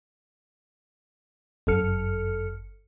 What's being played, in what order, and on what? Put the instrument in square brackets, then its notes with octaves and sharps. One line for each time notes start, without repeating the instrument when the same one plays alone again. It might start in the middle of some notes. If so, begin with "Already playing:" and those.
[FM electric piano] G1 F#2 A4 F6 C#7